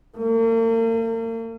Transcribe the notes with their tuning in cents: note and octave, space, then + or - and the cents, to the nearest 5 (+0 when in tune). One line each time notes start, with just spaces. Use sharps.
A#3 -45